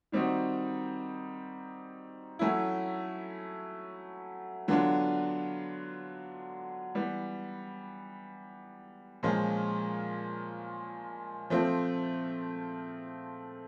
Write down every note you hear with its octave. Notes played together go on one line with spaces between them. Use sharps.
D#3 G3 C4 D#4 F#4
F#3 A3 C#4 E4
D3 F#3 B3 D4 F4
E3 G3 B3
A#2 F3 G#3 C#4 F4
F3 A3 C4 F4